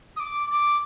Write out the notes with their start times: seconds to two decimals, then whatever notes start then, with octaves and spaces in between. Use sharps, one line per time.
0.16 D#6
0.20 D6
0.51 D6